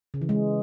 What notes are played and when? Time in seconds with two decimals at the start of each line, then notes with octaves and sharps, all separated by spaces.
0.14 C#3
0.21 E3
0.29 G#3